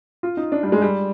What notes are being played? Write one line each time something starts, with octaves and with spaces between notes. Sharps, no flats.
F4
D#4
D4
G3
G#3
G3